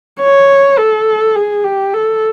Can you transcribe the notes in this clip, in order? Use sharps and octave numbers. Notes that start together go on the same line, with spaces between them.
C#5
A4
G#4
G4
A4